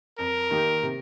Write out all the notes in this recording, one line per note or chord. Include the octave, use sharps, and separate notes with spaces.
F2 A#4
D#3 A#3 D#4 G4
C3